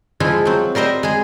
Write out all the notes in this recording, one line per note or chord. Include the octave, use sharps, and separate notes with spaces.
F3 G#3 E4 F4
F#3 C4
G3 A#4 C5 D#5 E5
G#3 G#4